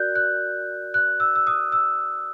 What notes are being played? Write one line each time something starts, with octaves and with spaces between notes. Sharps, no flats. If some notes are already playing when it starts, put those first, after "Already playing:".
Already playing: F#4 A#4 D5 F#6 G6
F#6
F#6
E6
E6
D#6
E6